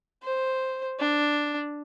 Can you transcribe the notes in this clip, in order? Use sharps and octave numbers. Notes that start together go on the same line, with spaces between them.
C5
D4